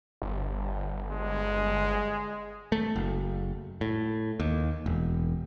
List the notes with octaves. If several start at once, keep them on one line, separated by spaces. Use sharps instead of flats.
G1
G#3
A3
F#1
A2
D#2
E1